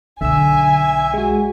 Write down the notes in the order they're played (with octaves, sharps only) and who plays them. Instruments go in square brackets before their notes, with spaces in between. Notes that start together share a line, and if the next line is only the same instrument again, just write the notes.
[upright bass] B1 [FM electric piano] D3 E6 [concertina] E5 [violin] G#5
[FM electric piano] G#3 F#4